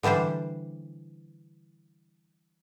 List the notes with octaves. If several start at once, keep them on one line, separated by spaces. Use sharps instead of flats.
D3 E3 G3 D4 C5